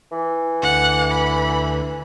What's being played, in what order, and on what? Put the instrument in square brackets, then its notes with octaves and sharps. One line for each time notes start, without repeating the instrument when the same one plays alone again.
[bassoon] E3
[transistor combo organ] D2 [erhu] F#5
[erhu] B5